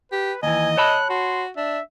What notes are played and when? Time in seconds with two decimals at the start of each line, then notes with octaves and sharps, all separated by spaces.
0.12 G4 B4
0.43 D#2 E3 D#5 G#5
0.77 C#5 A5 B5 F#6
1.10 F#4 C6
1.57 D4 E5